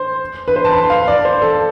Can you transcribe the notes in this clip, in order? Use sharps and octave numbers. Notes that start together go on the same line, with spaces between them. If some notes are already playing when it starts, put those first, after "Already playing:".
Already playing: C5
B4
C5
A5
B5
C6
F5
D5
C5
A4